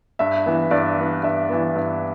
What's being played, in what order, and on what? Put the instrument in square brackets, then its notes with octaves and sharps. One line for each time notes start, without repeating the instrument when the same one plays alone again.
[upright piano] G2 E5
E3 B3
G2 D5
E3 B3
G2 E5
E3 B3
G2